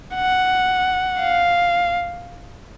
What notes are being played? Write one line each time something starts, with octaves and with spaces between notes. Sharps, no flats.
F#5
F5